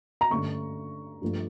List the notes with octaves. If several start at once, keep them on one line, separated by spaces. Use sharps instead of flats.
A#5
G2 D3 A3 C#4 C#6
G2 F3 A3